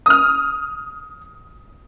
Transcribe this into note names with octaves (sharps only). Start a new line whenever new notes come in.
D#6 F6